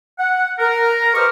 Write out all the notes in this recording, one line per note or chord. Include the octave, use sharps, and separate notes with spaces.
F#5
A#4
G4 B4 C5 D#5 C#6 F6